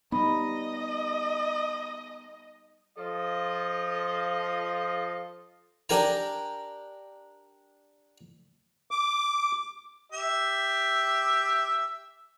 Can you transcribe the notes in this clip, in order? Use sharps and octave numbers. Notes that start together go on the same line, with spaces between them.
G3 B3 D#4 D#5 B5
F3 F4 A4 D#5
D4 G4 A#4 G#5 A#5
D6
G4 E5